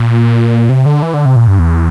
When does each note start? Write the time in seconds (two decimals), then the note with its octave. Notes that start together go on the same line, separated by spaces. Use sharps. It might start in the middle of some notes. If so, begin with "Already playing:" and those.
Already playing: A#2
0.69 C3
0.86 D3
1.02 E3
1.14 D3
1.25 C3
1.36 A#2
1.48 G2
1.59 E2